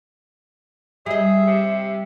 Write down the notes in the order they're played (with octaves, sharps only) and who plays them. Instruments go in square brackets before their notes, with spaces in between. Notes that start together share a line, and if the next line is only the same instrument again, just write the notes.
[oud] G3 D#5 [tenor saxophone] G#4 [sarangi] E5
[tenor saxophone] C3